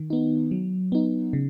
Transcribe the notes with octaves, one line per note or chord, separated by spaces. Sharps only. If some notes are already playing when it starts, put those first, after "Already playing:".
Already playing: D#3
B3 D#4
F#3
B3 D#4
C#3